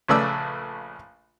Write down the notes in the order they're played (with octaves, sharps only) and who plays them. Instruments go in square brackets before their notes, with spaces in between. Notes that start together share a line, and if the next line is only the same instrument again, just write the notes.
[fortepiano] A#1 C#3 A3 B4 D5 E6